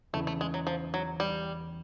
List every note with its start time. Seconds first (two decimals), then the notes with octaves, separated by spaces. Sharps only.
0.13 E2 C#3 E3 A3
0.27 A3
0.41 G#3
0.54 F#3
0.67 F3
0.94 F#3
1.20 G3